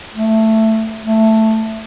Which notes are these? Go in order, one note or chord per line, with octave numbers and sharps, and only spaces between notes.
A3
A3